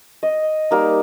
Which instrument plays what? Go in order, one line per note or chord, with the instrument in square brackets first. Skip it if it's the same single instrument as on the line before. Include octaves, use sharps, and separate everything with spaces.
[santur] D#5
G3 A#3 D#4